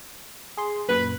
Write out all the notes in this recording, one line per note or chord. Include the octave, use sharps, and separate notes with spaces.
G#4 C6
F#2 A#2 B4